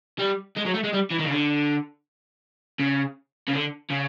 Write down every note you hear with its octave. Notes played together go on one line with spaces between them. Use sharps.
G3
G#3
F#3
A3
G#3
G3
E3
D#3
C#3
D3
C#3
C#3
D3
C#3